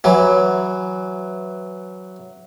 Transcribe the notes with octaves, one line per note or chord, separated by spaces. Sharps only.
E3 F#3